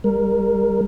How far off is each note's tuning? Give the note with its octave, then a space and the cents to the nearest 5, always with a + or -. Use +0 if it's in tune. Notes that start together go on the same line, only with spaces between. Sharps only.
G3 +40 A#4 +0